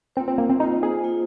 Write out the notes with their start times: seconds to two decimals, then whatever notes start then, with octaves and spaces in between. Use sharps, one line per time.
0.16 A#3 C4 F4 C5
0.28 C4
0.38 A#3
0.50 C4
0.60 A#3 D#4 F4 C5
0.83 G#4
1.04 A#3 F4 C5